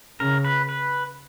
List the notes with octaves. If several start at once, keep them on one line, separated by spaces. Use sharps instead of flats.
C#3 A#4
B4
B4